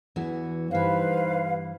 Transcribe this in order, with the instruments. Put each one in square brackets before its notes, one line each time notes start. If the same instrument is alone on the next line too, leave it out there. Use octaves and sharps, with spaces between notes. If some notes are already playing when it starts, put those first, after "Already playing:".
[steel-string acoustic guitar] E2 E3 F#4
[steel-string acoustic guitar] G2 E3 [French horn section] D#4 G4 C5 [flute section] B4 F5